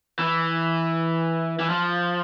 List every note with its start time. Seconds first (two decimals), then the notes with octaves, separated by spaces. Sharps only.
0.19 E3
1.60 E3
1.70 F3